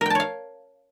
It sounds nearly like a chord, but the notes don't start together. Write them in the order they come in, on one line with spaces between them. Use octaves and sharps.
A#4 G5 A5 C#5 F5